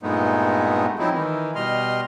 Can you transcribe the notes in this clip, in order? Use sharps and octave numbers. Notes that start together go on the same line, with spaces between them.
G2 A#2 G#3 A3 B3 D#4
F3 F#3 C4 D#4 E4
D#3 E3
B2 G3 D#5 C6 F6